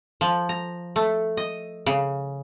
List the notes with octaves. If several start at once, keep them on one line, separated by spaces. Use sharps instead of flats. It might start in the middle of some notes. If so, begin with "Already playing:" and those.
F3
A#5
A3
D#5
C#3